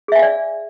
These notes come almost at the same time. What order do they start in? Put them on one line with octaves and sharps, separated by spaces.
G#4 E5 G#5 F5 D5